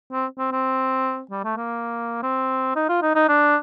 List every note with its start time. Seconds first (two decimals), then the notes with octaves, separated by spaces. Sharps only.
0.12 C4
0.38 C4
0.52 C4
1.31 G3
1.44 A3
1.57 A#3
2.23 C4
2.76 D#4
2.89 F4
3.02 D#4
3.15 D#4
3.29 D4